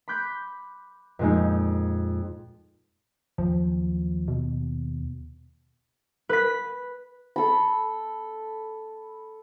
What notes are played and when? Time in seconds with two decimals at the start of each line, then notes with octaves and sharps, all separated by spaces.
0.08 B5 C6 D6 F#6 G6 B6
1.19 F2 A#2 G#3 A#3 D#4
3.38 D#2 F3 F#3
4.28 B2
6.29 B4 B6
7.36 A4 B5